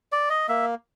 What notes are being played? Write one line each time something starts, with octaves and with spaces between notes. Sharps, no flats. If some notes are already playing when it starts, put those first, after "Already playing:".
D5
D#5
A#3 E5